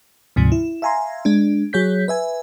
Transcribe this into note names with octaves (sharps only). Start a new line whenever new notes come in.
D2 G#2 C3 F3
E4
E5 F5 G#5 A#5 C6
G#3 D4
F#3 G#4 C#5 G6 B6
B4 E5 G#5